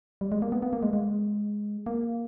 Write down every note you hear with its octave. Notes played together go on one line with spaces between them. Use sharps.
G3
G#3
A#3
B3
B3
A#3
G#3
G#3
A#3